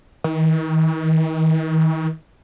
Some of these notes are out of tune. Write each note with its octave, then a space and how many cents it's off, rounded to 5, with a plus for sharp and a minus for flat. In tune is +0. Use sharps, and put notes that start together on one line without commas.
D#3 +40